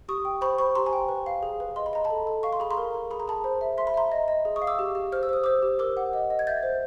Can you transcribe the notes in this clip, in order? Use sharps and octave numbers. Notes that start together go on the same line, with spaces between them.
G4 C#6 D#6
G5
C5 B5 C#6
C5 B5 C#6
G4 A#5 C6
G#5 A#5
G5
B4
F5
G#4
B4
D#5 C6
B5
D#5 A#5
A5 B5
A4
A4
F5 C#6
C6
G#4 B5
A#5 C6
A#4
A#4
G#4 B5
A#5
G#4 A5 B5
C5
E5
E5 C6
B5
E5 A#5 C6
D#5
D#5
G#4
C#6 D#6
F5
D6 E6
G4
G4
C5 F6
E6
C5 D#6
C5 D6 E6
G4
A#4 D6 E6
F#5
D#5
D#5
G#6
E5 G6 A6
C5